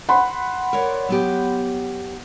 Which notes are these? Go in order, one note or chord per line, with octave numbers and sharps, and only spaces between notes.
F#5 B5 C6
A#4 C#5 D5
F#3 B3 G4